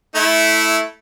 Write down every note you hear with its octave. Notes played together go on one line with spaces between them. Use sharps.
A3 E4